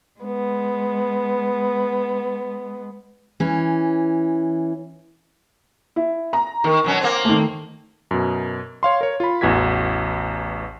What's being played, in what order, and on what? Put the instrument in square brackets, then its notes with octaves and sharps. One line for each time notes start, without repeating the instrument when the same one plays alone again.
[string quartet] G#3 B3
[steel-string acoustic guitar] E3 C#4
[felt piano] E4
A#5
[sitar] D#3 [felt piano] A#4
[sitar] B2 F#3 C#4
A#3 C4
[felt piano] D#3 A3
[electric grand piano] F#2 B2
C#5 F5 C6
A#4 C#5
F4 B5
A1 E2 F#4 G#6 B6